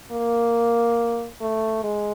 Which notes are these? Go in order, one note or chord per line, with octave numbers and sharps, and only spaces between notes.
A#3
A3
G#3